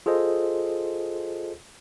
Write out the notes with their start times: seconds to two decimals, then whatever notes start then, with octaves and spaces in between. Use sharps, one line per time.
0.06 F4 G#4 A4 C5 D#5